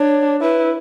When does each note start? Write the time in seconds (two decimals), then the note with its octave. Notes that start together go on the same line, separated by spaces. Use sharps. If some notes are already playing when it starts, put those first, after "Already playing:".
Already playing: D4 C#5
0.41 E4 B4